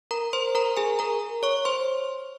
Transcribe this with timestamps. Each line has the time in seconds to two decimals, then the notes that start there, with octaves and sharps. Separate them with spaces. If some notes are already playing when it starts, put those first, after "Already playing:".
0.11 A#4 A#5
0.33 C5 C6
0.55 A#4 A#5
0.77 G#4 G#5
0.99 A#4 A#5
1.43 C#5 C#6
1.65 C5 C6